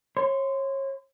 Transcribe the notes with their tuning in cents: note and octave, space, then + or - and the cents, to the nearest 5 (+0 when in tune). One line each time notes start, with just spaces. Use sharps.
C#5 -30 C6 -20